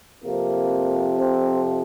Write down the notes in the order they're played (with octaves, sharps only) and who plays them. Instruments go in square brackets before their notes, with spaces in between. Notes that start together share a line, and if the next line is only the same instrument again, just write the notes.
[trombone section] F2 C3 F3 A#3
C4